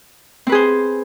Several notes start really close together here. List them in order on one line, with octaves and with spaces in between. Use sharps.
C4 B4 G#4 C5